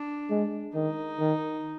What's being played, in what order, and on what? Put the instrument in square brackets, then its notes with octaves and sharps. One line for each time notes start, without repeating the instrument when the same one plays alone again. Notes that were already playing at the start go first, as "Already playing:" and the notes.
Already playing: [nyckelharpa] D4
[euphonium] G#3
[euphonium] D#3 [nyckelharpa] D#4
[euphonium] D#3